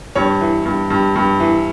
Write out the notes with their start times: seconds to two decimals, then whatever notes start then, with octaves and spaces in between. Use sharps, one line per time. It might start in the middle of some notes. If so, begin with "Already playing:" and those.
0.15 G2 C#5
0.41 E3
0.65 G2
0.90 G2
1.16 G2
1.40 E3